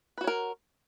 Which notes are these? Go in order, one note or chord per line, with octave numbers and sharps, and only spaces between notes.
F#4 A#4 B4 C#5